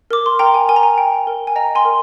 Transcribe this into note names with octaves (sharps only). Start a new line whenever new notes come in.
A#4 D6
C6
A#4 G5 A#5
G#5
A#4 G#5
A#5
G#5
G5
A#4
G#5
D#5 G5 A#5
G#5 C6
A#4